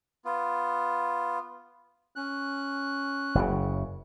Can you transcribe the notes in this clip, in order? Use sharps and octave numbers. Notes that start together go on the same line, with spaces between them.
B3 F4
C#4 F#6
F#1 C#3